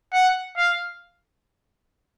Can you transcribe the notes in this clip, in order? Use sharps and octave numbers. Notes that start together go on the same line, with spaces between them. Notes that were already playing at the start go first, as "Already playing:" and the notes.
F#5
F5